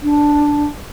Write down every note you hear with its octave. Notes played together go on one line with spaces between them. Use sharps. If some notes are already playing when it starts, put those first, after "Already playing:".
D4